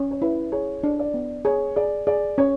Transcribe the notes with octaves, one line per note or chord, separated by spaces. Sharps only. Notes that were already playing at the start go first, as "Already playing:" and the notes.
Already playing: C#4
C#5
E4 B4
G#4 C#5
D4
D5
B3
G#4 C#5
G#4 D5
G#4 D5
C#4 C#5